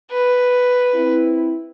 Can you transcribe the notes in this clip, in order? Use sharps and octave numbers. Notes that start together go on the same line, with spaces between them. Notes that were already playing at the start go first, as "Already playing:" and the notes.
B4
C4 E4